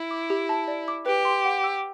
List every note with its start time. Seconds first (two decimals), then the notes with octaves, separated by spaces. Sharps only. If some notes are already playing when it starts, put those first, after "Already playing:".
Already playing: E4
0.11 D6
0.30 G4
0.49 A5
0.68 D5
0.88 D6
1.06 G4 B4
1.25 C6
1.45 F#5
1.64 E6